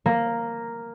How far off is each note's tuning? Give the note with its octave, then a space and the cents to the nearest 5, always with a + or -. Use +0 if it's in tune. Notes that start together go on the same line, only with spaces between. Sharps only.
A#3 -5